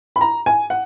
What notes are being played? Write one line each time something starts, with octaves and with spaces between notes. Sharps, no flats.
B5
A#5
G#5
F#5